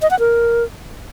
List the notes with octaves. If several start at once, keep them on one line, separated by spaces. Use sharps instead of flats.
D#5
F#5
A#4